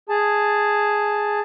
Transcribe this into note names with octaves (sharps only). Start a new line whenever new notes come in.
G#4 A5